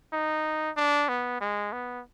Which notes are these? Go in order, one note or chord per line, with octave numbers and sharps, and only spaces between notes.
D#4
D4
B3
G#3
B3